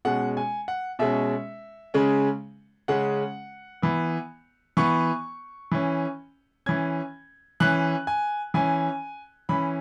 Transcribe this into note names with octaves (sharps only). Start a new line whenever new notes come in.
B2 G#3 C#4 F#5
G#5
F#5
B2 G#3 C#4 E5
C#3 G#3 C#4
C#3 G#3 C#4 F#5
E3 B3
E3 B3 C#6
E3 C#4
E3 C#4 G#6
E3 C#4 F#6
G#5
E3 C#4 G#5
E3 C#4 B5